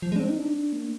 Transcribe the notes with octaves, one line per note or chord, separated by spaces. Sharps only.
F3
G#3
D4
C4
D#4
D4
A#3